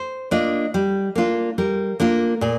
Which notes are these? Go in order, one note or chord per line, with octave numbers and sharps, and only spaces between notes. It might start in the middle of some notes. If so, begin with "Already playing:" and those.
Already playing: C5
A#3 D4 F4 D#5
G3
A#3 D4 F4
G3 A#4
A#3 D4 F4 A#4
A#2 G#4